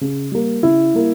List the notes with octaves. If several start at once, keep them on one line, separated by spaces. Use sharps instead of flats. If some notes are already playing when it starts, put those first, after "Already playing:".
C#3
G3 A#3
C#3 E4
G3 A#3